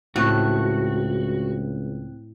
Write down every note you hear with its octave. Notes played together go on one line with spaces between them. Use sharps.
C#2 A2 C4 F#4 F#6